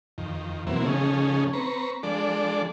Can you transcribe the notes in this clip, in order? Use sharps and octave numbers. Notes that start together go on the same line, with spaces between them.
F2 D#3
B2 E3 F#3 A#3 C4 E4
C#3 F3 A3 C#4 D#4 G#4
C4 B4 A#5 C#6
F3 G#3 D4 A4 D5